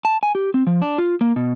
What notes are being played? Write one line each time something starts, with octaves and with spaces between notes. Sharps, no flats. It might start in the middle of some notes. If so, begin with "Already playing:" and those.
A5
G#5
G4
C4
F3
D4
F4
A#3
B2